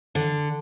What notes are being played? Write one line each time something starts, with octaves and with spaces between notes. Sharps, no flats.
D3